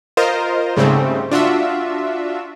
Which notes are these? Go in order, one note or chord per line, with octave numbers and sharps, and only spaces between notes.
F4 A#4 C5 D#5
G#2 C#3 G3 A3 C4
D4 F4 F#4 E5